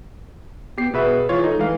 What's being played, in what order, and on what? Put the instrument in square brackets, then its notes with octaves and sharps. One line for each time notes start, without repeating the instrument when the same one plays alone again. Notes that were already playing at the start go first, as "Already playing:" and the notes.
[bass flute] B3 [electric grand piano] G4 C7
[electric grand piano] B2 B4 E5 [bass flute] G#4
[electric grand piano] E3 F4 C#5
[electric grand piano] D#4 [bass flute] A4
[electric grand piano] E3 F5 [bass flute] G#3